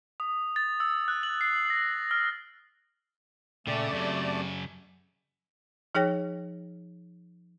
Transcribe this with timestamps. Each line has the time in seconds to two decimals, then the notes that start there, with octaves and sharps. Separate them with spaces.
0.20 D#6
0.56 A6
0.80 E6
1.08 F#6
1.23 F#7
1.41 C7
1.70 A#6
2.11 F6
3.67 A#2 C#3 A3 A4 D5 G5
3.92 F#2 C#3 F#3 C4 G4
5.95 F3 D#4 G#4 C#5 G5 A#6